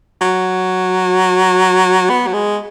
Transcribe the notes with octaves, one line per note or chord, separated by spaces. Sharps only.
F#3
B3
F#3
G#3